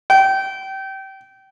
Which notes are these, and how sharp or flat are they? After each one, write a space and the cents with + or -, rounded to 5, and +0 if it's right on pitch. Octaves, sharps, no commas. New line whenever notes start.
G5 -25